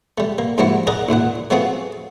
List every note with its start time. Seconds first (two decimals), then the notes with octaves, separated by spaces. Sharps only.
0.18 G3 A3
0.38 A#3
0.58 G#2 F3 G3 A#3 E4 F#4
0.87 G#4 A#4 D5 D#5 F#5
1.09 A1 D#2 A#2 F#5
1.50 A3 B3 C4 F4 F#4 G#4